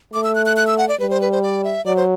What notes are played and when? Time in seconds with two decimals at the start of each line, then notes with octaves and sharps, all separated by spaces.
0.13 A3 D6
0.24 E6
0.35 F#6
0.46 F#6
0.57 F#6
0.67 E6
0.78 F#5
0.89 D5
1.00 G3 B4
1.10 C5
1.21 B4
1.32 C5
1.43 D5
1.64 E5
1.85 F#3 D5
1.96 C5